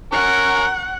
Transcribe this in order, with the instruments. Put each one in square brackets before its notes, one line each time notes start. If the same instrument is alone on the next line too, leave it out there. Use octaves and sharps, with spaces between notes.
[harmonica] C#4 A#4 C#6 [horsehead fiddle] F#5